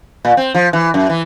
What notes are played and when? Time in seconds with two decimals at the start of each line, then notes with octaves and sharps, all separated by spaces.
0.25 A#2
0.37 C4
0.55 F3
0.73 E3
0.94 F#2
1.09 E3